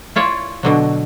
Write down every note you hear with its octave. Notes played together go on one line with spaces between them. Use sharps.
E4 F4 C#5 D5
B2 D3 F#3